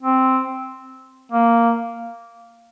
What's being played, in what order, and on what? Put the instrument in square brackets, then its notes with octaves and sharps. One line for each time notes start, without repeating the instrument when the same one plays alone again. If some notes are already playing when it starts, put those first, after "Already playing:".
[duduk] C4
A#3